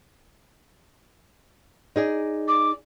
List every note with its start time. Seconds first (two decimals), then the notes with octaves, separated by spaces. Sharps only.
1.96 D#4 G#4 D5
2.48 D6